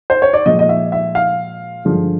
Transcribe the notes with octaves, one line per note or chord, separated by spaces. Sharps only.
C5
C#5
D5
A#2 F3 G#3 D#5
D#5
E5
E5
F5
G2 D3 F3 G#3